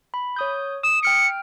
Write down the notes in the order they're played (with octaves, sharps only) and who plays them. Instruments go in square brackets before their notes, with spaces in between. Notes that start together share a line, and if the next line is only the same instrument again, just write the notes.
[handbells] B5
C#5 D#6 G6
[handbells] D#6 [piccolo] E7
[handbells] G5 F6 D7 [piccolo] C#7